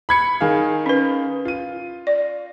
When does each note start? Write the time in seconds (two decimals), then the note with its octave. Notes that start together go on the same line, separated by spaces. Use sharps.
0.09 B5 G#6 C#7
0.41 D#3 G#4 F5
0.86 C#4 B4
1.45 F4 D#7
2.07 D5